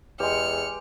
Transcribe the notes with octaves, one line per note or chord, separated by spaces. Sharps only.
E2 G#3 G4 F6 C#7